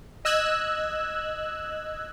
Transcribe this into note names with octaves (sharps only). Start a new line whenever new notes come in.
D#5 E6 F#6 G#6